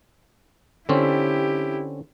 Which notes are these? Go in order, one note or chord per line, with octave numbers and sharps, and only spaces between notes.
D3 C4 C#4 E4 G4